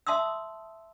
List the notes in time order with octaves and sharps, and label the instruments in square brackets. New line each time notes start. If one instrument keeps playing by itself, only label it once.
[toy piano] E5 A5 C6 D#6 E6